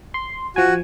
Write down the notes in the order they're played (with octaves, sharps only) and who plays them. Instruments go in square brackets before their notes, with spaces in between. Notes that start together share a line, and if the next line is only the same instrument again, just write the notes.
[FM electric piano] C6
[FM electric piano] F3 G#5 [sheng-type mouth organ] F#4